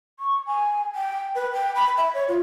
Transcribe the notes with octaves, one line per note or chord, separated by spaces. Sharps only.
C#6
G#5
G5
B4
G5
B5
E5
C#5
F4